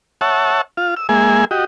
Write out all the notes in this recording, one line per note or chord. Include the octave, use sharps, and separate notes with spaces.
C#5 E5 F#5 A5
F4 F5
E6
G#3 A#3 G#4 E5 G#5
F#4 G4 D#5